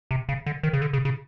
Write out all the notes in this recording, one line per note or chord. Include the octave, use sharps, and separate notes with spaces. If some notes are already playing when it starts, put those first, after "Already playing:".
C3
C#3
D3
D#3
C#3
D3
C#3
C#3